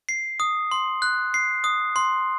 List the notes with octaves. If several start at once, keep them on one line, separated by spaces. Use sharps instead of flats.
C7
D#6
C6
F#6
C7
D#6
C6